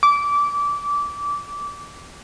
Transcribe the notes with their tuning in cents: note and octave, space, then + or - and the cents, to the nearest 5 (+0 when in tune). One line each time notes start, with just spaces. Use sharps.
D6 -20